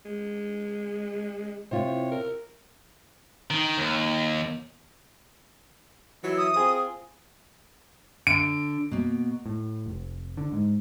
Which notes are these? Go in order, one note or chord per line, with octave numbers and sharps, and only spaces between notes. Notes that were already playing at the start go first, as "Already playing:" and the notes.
G#3
C3 F4 C#5
A#4
D#3
D#2
E3 F#3 E5
D#6
C4 F4 G#4
D3 D7
B2 A#3
A2
F1
D3
G#2